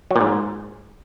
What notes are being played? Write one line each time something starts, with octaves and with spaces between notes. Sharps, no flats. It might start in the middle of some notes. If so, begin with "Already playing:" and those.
F#3
A#2
G#2